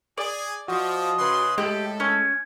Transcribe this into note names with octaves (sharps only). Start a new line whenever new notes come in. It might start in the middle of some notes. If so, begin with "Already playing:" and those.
G#4 D5
F3 F#4 D#5
C#3 B4 C6
A2 G#3 G4 A4
C#4 G#5